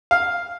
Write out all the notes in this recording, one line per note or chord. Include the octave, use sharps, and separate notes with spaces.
F5